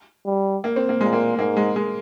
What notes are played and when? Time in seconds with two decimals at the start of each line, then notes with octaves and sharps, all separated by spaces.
0.26 G3
0.64 A#3
0.76 C4
0.89 A#3
1.01 A#2 G#3
1.13 A#3
1.38 G#2 A#3
1.57 G#3
1.76 G#3